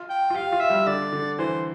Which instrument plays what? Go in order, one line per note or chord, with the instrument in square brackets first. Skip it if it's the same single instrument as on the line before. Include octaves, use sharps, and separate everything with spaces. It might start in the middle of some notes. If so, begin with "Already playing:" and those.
Already playing: [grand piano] F4
[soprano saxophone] G5
[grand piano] F4
[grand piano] G4 [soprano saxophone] F5
[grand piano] F4
[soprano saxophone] E5
[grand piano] G3
[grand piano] D3 [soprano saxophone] D5
[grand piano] D3
[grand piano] E3 [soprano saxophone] C5